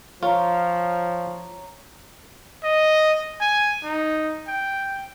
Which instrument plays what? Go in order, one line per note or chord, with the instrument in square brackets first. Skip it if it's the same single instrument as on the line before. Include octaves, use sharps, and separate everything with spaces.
[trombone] F3 [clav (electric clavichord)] F4 [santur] C#5 A#5
[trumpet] D#5
G#5
D#4
G5